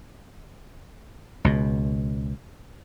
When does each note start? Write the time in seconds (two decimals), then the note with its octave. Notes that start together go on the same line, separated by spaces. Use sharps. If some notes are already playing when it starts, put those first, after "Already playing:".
1.44 C#2 B2